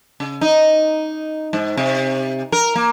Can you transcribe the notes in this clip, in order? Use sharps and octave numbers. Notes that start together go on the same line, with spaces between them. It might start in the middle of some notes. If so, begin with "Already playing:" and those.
C#3
D#4
G#2
C3
A#4
A#3